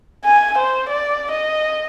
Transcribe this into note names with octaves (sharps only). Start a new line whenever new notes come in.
G#5
C5
D5
D#5